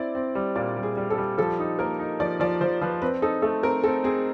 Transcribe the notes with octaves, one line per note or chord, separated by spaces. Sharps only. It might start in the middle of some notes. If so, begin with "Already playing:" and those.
Already playing: C4 E4 D5
C4
G3
A#2 D5
G3
G#4
G3
A4
G3
F3 A4
D#4
A#3 A#4
D#4
F3 D5
F3 D5
F3 C5
F3 B4
C4 B4
D#4 A4
A3 A4
C4 A#4
C4 A4
C4 G#4